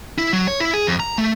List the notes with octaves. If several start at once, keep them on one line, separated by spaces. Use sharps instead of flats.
E4
F#3
C#5
E4
G#4
F2
A#5
A3